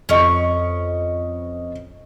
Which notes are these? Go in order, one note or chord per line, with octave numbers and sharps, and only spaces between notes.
F2 C#4 D#5 C#6 C#7